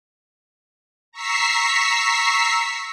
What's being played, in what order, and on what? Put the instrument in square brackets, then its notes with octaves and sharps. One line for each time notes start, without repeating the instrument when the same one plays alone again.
[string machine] A#5 C#6 E6 B6 C7